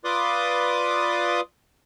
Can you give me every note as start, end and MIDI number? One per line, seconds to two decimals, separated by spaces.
0.05 1.41 65
0.05 1.41 71
0.05 1.41 74
0.05 1.41 84
0.05 1.41 86
0.05 1.41 87